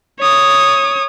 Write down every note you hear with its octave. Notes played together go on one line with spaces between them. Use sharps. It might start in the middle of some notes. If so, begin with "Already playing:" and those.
C#5 D#6